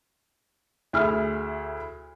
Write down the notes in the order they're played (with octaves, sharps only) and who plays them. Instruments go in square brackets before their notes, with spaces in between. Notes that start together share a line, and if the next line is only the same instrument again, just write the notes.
[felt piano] D2 E4 G#4 F6